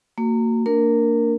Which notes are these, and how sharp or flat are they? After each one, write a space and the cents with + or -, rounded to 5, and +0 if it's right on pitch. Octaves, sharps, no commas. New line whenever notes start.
A#3 -30 F#4 +0
A#3 -30 D4 -5 A#4 +0